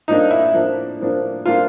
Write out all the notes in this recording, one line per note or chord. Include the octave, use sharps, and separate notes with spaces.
A2 F3 A#3 D4 D#4
E4
A2 F3 A#3 D4
A2 F3 A#3 D4
A2 F3 A#3 D4 F4